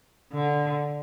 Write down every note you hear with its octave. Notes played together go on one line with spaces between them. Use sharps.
D3